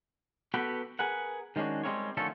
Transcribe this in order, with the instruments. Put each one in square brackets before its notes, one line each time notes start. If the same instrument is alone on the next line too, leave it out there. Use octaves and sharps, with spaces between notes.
[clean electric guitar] B3 F#4 G4 A4 B4
G#4 A#4 B4 F#5
D#3 G#3 C#4 D4 F#4
G3 G#3 C4 F4 A#4 C#5
D#2 D3 F3 A3 C#4 A4